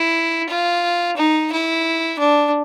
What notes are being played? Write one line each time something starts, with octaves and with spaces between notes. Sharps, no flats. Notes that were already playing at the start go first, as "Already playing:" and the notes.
Already playing: E4
F4
D#4
E4
D4